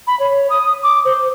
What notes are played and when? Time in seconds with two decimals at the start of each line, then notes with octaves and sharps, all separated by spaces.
0.07 B5
0.19 C#5
0.50 D#6
0.83 D6
1.05 C5